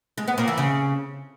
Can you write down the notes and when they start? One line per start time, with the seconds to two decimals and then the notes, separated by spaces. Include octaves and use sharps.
0.18 G#3
0.28 B3
0.38 A#2
0.48 E3
0.58 C#3